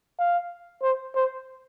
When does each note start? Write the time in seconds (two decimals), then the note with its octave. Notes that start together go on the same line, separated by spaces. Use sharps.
0.19 F5
0.83 C5
1.15 C5